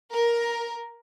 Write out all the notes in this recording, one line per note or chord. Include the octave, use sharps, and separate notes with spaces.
A#4